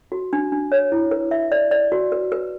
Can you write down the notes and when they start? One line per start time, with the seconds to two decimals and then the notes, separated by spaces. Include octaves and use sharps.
0.12 F#4
0.33 D4
0.52 D4
0.72 C#5
0.92 E4
1.11 B4
1.31 E5
1.52 D5
1.71 D5
1.92 F#4
2.12 B4
2.32 B4